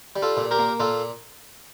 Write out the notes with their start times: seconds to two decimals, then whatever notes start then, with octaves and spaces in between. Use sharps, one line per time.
0.16 G3
0.22 F4 A4
0.37 A#2
0.51 G4 A#4
0.59 A#3
0.80 A#2 F4 A4